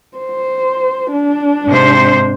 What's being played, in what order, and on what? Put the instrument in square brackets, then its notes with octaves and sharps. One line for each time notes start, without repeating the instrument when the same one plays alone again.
[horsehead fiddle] C5
D4
[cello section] G#2 C3 C5